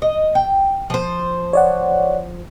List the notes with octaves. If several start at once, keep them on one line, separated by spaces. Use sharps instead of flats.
D#5
G5
F3 C5
C#5 D5 F#5